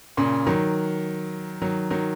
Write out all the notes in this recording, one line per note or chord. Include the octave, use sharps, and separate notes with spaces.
A#2 C#3
D#3 F#3
D#3 F#3
D#3 F#3